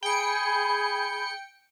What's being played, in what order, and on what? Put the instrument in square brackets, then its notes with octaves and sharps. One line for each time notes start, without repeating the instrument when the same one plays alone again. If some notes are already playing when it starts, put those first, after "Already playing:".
[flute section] G#4 B5 [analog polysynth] G5 C#7